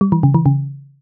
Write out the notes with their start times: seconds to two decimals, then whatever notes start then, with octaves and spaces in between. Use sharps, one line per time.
0.01 G3
0.12 E3
0.23 C#3
0.34 E3
0.46 C#3